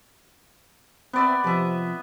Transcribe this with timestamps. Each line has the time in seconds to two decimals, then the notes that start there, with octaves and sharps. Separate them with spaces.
1.13 B3 C4 D5 E5
1.44 C3 F3 D#5 E5